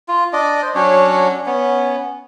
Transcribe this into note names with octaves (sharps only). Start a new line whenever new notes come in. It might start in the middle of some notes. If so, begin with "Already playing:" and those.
F4
D4 D5 D#5
C5
F#3 C#4 D4 C#5
B3 C#4